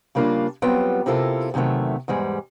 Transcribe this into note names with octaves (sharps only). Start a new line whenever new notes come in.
C#3 G3 A#3 D4 F4
F#3 G3 B3 C4 F4 G5
C3 E4 F4 A4 A#4
E2 C3 D#3 F#3 A3
E2 G#2 G3 G#3